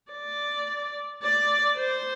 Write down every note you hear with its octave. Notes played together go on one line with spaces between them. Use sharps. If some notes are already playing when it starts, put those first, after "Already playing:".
D5
D5
C5